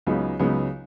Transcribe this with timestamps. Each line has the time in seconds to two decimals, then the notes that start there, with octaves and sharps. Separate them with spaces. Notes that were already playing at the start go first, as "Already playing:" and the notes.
0.07 C#2 C#3 F#3 B3 D#4
0.39 C#2 C#3 F#3 B3 D#4